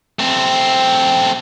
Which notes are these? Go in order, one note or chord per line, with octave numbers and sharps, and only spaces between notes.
A3 C4